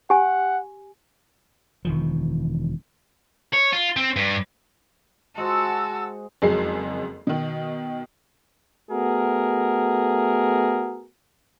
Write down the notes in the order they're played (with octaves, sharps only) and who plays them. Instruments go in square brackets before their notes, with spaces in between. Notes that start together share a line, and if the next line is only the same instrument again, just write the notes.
[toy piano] G4 G#5 [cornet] F#5
[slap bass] E1 D#3 F3
[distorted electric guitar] C#5
F4
C4
G2
[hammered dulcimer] G#3 C5 [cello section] F#4 [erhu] A5 [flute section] E6
[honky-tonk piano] F#1 F2 F#3 G#3 G#4 C7
B2 D#3
[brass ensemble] A3 B3 F#4 G#4 A#4